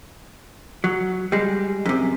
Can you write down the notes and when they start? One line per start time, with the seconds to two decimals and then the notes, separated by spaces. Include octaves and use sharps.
0.84 F#3
1.32 G3 G#3
1.85 F#2 C3